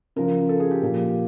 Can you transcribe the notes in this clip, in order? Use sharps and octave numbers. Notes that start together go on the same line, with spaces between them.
C#3 F3 A#4
A4
G#4
G4
A#2 F3